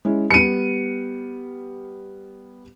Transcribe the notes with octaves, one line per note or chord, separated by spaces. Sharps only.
G#3 C#4 E4
G3 B3 C#7 D#7